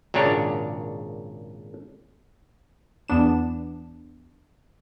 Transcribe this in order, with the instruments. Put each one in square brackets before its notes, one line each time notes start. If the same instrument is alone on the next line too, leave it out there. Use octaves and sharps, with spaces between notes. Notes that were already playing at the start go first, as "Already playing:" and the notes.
[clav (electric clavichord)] G#1 A#2 C#3 D4 C#5
[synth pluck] E2 B3 D4 E7